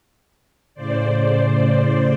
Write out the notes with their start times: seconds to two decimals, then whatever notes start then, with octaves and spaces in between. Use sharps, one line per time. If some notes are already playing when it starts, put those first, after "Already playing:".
0.74 A2 C#3 C5 D5